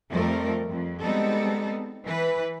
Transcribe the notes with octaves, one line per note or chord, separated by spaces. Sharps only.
F2 F3 G3 A3 A#4
F2
G3 G#3 B3 C4 D#4 A4
E3 B4